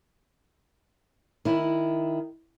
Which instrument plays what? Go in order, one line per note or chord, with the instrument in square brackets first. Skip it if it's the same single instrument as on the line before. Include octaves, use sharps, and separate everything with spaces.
[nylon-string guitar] D#3 E4